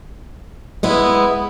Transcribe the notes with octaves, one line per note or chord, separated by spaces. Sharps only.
G#3 B3 E4